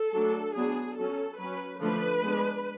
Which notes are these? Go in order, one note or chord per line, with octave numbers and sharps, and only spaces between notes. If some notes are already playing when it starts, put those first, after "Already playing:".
Already playing: A4
F#3 A3 D4
F#3 B3 D4 G#4
F#3 C#4 A4
F#3 C#4 B4
D3 F3 A3 D4 B4
G#3 B3 D4